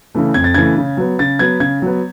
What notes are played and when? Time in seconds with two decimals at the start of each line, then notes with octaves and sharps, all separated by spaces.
0.15 C#3 E3 A3
0.34 F2 G#6
0.44 A6
0.54 C#3 E3 A3 G#6
0.77 C#3
0.97 F#3 B3
1.19 C#3 A6
1.39 F#3 B3 G#6
1.60 C#3 G#6
1.82 F#3 B3